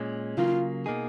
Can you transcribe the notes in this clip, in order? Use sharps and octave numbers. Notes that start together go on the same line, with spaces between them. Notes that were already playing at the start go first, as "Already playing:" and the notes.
Already playing: A#2 G#3 C#4
C#3 F#3 A#3 F4
B2 A#3 D#4 G#4